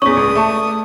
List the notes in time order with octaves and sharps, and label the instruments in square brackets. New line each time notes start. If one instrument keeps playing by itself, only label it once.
[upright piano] E2 C#4 [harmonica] D4 D#6 [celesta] C#6 B6
[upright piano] C#2
[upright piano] A3 [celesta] A5 C#6